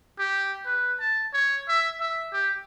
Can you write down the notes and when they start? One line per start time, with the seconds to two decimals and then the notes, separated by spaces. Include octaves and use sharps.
0.19 G4
0.65 B4
1.00 A5
1.33 C#5
1.69 E5
2.00 E5
2.33 G4